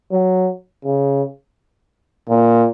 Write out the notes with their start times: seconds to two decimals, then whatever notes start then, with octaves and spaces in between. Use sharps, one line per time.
0.11 F#3
0.85 C#3
2.29 A#2